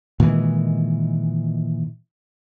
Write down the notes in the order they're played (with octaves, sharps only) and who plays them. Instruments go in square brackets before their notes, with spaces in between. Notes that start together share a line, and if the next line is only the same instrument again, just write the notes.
[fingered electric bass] A#2 D#3 E3 G#3